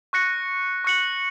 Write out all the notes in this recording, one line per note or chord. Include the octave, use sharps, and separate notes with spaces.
C#6 F#6 A#6 C#7
C#6 F#6 C#7 F#7